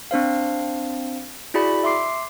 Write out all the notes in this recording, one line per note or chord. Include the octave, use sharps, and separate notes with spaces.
C4 D4 C5 F5
E4 F#4 G#4 D5 B5
E5 C6 D6 C7